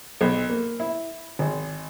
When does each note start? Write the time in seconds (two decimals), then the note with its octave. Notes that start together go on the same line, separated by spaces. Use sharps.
0.21 B1
0.50 A#3
0.80 E4
1.39 G#1